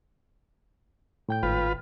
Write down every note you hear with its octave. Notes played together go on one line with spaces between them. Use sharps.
A2 G5 G6
G#1 F4 B4